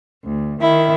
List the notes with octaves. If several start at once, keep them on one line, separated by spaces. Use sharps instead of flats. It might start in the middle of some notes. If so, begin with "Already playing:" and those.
D2
D#3 E4